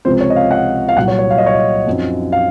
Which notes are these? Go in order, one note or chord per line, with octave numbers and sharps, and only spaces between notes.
C#2 C3 F3 C4 C5
C#5
D#5
F5
F#5
F5
C2 A#2 F#3 F#5
C#5
C#5
F5
D#5
C#5
D#5
F#2 F3 C4 D#4
F5